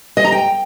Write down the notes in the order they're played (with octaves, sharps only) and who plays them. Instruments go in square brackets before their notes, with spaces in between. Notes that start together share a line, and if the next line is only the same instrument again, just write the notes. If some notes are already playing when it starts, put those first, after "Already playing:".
[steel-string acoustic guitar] D#5
A#5
G5